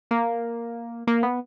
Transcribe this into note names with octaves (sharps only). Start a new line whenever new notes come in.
A#3
A#3
B3